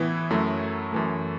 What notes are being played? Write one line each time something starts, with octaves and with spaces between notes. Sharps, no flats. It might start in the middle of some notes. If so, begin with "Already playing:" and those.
Already playing: A2 E3 B3 E4
F#2 F#3 A3 E4
F#2 E3 A3